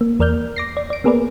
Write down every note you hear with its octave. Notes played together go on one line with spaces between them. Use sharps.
A#3
E2 A#4 D5 F6 G6
D6 A#6 C7
D5
D5 D7
A#3 B3 G#4 A#4 B4 D5